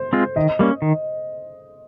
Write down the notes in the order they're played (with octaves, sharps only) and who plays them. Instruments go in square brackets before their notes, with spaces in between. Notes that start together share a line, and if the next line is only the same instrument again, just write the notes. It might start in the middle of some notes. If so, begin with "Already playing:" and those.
Already playing: [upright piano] C5
[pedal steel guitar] G#3 C4 F4
[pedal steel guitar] D#3 [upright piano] D#5
[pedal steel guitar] G3 A#3 C#4
D#3